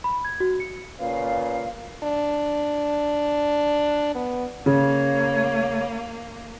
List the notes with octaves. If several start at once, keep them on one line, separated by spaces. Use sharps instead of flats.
B5
G#6
F#4
C#7
A#2 C#3 B4 F5
D4
B3
C#3 A#3 C#5